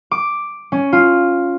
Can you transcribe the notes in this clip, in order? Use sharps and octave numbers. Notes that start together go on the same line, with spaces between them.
D6
C#4
F4